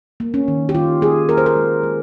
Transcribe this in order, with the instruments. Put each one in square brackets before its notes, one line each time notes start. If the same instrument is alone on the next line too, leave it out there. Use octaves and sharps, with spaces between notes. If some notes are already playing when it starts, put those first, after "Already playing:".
[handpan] A#3
C#4
D#3
G4
D#3 F4
A#3 G#4
A#3 A#4
C5
A#4
G#3
G#3